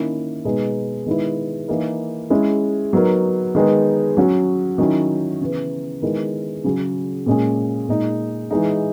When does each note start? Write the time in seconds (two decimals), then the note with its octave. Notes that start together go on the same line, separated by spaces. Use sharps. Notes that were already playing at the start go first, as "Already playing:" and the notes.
Already playing: D#3 A#3 C#4 E4
0.45 B2 G#3 B3 D#4 G#4
1.06 D#3 G#3 B3 E4
1.68 E3 A#3 D#4 A#4
2.30 G#3 C#4 E4
2.93 F#3 B3 D#4 A#4
3.55 D#3 G#3 B3 D#4
4.17 F#3 C#4 F#4
4.78 D#3 F#3 C#4 E4
5.41 C#3 E3 B3
6.02 D#3 G#3 B3 E4 A#4
6.64 C#3 F#3 C#4 G#4
7.26 A#2 G#3 C#4 G#4
7.89 A#2 G#3 D#4
8.51 E3 G#3 D#4